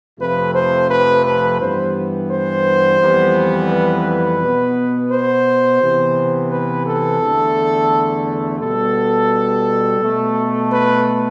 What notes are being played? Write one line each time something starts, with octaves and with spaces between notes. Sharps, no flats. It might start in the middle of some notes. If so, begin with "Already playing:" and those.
F2 C3 F3 A3 B4
C5
B4
B4
G2 E3 G3 B3 C5
C5
F2 E3 G3 B3
B4
B2 B3
C5
C3 E3 B3
B4
A4
E2 D3 A3
B2 G3 B3 A4
B2 A3
B4